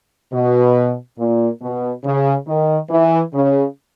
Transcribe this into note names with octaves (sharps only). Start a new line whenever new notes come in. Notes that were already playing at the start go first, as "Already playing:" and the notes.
B2
A#2
B2
C#3
D#3
E3
C#3